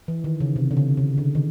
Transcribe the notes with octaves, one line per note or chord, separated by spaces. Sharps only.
E3
D#3
C#3
C3
D3
C#3
C#3
D3
D#3